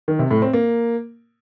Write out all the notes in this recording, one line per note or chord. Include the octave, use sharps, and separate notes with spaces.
D#3
C3
A2
C4
A#3